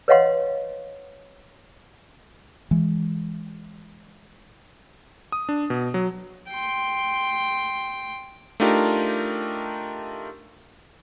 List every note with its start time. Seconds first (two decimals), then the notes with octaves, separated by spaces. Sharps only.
0.08 B4 C#5 D#5 F5 F#5 C6
2.71 E3 G#3
5.32 D#6
5.49 D4
5.70 B2
5.94 F#3
6.49 G5 C6
8.60 A3 D4 D#4 F4 G4 A#4